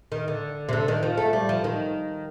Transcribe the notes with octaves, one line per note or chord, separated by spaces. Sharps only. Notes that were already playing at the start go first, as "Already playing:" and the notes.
D#3
D3
C3
D3
D#3
F3
A3
G3
F3
D#3